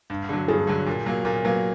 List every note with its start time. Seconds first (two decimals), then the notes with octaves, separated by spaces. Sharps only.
0.10 G2
0.29 D3 F#3
0.48 G2 G#4
0.67 D3 F#3
0.86 A#2
1.06 F#3 A#3
1.25 A#2 A#4
1.45 F#3 A#3 B4